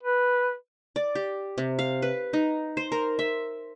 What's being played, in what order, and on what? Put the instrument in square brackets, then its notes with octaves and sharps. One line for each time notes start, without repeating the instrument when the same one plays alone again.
[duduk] B4
[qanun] D5
G4
C3
F5
B4
D#4
C5
A#4
E5